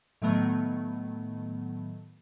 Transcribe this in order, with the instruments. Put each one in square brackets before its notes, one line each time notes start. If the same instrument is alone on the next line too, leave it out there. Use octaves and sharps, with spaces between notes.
[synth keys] A2 D#3 F#3 A3 B3